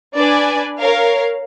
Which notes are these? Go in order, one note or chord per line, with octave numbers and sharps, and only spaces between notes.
D4 B4 D5 G#5
A#4 C#5 F5